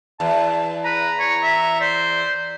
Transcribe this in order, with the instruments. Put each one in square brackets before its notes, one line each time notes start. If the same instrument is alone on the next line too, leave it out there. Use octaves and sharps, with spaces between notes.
[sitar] E2 [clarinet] A5
[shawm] B4 [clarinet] A#5
[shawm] C#5
E5
[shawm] C5 [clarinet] D5